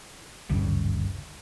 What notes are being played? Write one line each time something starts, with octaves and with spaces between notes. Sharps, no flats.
G#1 D2 G2 C#3